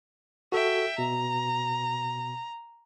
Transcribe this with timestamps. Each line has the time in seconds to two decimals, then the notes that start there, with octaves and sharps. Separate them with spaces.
0.52 F#4 A4 E5 G5
0.98 B2 A#5